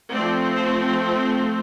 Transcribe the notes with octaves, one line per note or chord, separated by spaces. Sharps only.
F3 A3 C4 D5
C5